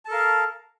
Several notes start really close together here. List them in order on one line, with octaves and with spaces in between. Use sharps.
A5 A4 A#4 F5